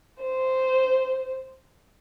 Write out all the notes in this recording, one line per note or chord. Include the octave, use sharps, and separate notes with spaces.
C5